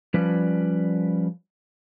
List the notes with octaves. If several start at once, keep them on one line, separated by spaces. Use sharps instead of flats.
F3 G3 C#4 B4 D5